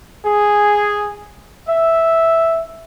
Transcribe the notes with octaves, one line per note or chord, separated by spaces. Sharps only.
G#4
E5